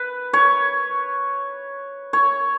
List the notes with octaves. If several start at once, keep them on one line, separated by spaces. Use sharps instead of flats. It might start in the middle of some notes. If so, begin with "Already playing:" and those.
Already playing: B4
C#5
C#5